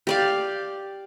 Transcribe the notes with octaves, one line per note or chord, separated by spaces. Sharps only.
G4 D5 F5